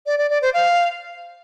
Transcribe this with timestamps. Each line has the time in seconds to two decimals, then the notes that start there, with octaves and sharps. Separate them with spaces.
0.06 D5
0.18 D5
0.30 D5
0.42 C5
0.54 F5